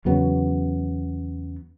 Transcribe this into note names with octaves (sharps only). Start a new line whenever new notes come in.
E2 C#3 F#3 B3